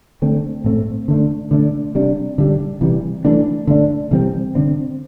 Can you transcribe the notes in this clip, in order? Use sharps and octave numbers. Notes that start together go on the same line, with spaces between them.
D3 A3 C4
A2 A3 C4
D3 A3 D4
D3 A3 D4
C3 G3 D4
D3 G3 D4
C3 E3 G3
E3 A3 D4
D3 A3 D4
C3 E3 G3 C4
D3 C4